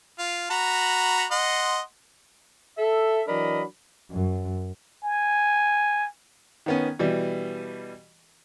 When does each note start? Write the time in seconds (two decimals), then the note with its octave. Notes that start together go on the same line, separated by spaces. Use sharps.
0.19 F4
0.50 F#4 A#5 B5
1.31 D#5 F#5 C6
2.78 A4 E5
3.28 E3 F#3 D4 A#4 D#5 B5
4.11 F#2
5.04 G#5
6.66 D#3 B3 C#4
6.99 B2 E3 G3